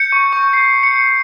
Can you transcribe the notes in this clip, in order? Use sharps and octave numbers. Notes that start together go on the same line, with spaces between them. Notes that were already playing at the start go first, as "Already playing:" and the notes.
Already playing: G6 C#7
C#6
C#6
C#6 C7
C#6
C#7
G6